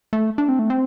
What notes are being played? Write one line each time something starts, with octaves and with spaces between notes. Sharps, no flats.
A3
D4
C4
A3
C4